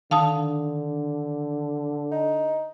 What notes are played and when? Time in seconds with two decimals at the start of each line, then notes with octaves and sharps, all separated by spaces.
0.11 D3 D#3 D4 F5 A5 D#6
2.12 D#4